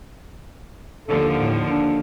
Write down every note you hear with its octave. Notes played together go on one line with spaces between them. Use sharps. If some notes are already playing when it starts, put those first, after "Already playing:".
D#2 D3 F3 A4
A2
D4